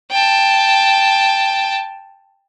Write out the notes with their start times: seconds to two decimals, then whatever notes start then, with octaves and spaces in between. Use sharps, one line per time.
0.11 G5 A5